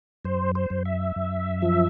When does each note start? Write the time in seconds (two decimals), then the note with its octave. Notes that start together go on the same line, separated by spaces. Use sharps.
0.25 F#2 C5
0.55 C5
0.70 F#2
0.86 E5
1.16 F#2
1.62 F3